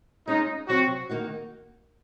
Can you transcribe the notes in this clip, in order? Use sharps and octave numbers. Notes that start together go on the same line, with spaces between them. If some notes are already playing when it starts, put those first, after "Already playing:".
G#3 C#4 D#4 F4
C3 F#3 C4 F4 F#4
D#3 A#3 D#4 F#4